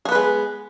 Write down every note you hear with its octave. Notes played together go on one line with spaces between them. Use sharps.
G#3 B3 G#4 B4